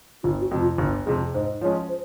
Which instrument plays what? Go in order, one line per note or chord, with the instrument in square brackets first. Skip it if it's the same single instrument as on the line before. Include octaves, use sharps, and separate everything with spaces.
[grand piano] G1 [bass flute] F4
[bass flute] F#4
[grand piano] F2 C3
[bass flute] F4
[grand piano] G1
[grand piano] F2 C3 [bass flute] G#4
[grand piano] G#2 [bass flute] C5
[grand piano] F3 G#3 C#4 [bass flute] C#5
[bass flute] C5